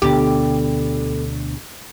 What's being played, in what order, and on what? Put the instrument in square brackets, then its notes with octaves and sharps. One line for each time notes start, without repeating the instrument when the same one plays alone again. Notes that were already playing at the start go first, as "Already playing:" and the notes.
[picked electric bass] D2 B2 D3 [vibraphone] B3 D4 A4 [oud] G4